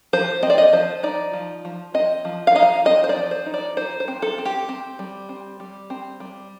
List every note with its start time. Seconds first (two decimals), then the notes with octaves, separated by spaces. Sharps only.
0.13 F3 C5
0.43 C4 D#5
0.50 D5
0.58 D#5
0.73 F3 C5
1.03 D#4 D5
1.33 F3
1.65 F3
1.94 C4 D#5
2.25 F3
2.47 F5
2.55 D#4 D#5
2.63 F5
2.85 C4 D#5
3.04 C5
3.09 D5
3.17 F3
3.31 C5
3.46 D#4
3.54 D5
3.77 D#4 C5
4.00 C5
4.08 C4
4.22 A4
4.38 C4
4.45 G4
4.69 C4
4.99 G3
5.29 C4
5.60 G3
5.90 C4
6.20 G3